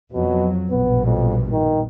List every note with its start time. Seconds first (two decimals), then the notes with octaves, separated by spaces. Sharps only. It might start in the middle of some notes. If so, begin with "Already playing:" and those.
0.13 F2 B2 F#3
0.70 A#1 G2 B2 B3
1.05 F2
1.52 D#3